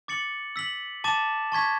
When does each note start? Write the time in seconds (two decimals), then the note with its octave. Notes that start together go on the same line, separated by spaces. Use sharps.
0.08 D6 A6 C#7 F#7
0.56 E6 B6 F#7
1.04 A5 D6 A6 E7
1.52 A5 C#6 G#6 B6